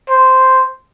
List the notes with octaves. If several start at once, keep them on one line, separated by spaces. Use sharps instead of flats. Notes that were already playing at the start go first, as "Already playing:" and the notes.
C5